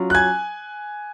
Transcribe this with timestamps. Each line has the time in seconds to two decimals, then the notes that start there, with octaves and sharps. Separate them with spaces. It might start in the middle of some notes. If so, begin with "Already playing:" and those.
Already playing: F#3 C#4 F4
0.10 F#6
0.15 G#5 G#6